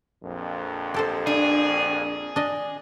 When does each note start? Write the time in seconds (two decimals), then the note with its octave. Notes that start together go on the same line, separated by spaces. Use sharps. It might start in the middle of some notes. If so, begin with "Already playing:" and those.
0.24 A#1 F2
0.94 G4 A4 C5
1.27 D4 G#4
2.36 D4 D#5